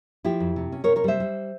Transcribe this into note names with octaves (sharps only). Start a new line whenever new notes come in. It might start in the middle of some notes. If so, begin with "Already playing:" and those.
F3 E4 G4
F2
C3
C#4
A#4 C#5
C3
A#4 C#5
G3 C5 E5
G3